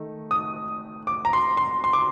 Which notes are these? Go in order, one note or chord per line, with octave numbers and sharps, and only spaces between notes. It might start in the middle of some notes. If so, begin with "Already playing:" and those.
Already playing: D#3 A3 D#4
D#6
D6
A#5
C6
C6
C6
D6